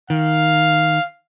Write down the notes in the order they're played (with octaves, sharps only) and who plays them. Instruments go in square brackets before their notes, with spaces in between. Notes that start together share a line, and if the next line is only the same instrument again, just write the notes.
[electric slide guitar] D#3 [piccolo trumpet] F5